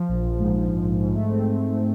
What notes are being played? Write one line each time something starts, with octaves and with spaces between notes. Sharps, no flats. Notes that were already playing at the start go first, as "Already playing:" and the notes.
Already playing: F3
A#1
A#1
G#2
F3
A#1
A#1
G#2
A3
C4